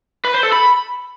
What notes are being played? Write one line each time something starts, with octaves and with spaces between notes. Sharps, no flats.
B4
C5
A4
B5